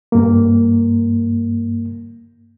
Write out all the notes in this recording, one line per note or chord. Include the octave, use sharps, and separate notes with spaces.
G2 A#3